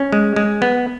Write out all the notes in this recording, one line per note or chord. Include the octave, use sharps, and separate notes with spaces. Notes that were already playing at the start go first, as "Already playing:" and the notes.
Already playing: C#4
G#3
G#3
B3